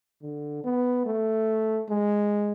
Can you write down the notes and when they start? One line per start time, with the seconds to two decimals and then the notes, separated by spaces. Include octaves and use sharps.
0.22 D3
0.64 B3
1.06 A3
1.89 G#3